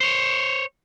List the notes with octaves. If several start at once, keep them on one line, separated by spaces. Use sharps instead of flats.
C5 C#5